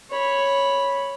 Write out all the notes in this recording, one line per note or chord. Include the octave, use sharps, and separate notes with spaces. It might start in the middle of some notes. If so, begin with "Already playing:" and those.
C#5 B5